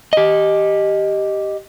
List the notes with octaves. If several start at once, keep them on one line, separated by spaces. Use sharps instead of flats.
G4 D#5